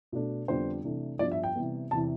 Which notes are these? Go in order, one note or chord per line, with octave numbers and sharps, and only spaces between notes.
B2 A3 D4
F2 D3 G3 B3 D4 C5
C3 E3 A3 D4
G2 F3 B3 D4 D5
E5
G5
C3 E3 G3 B3
E2 C3 E3 A5